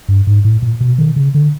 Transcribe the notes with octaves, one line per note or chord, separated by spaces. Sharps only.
G2
G#2
A2
A#2
B2
D#3
C#3
D3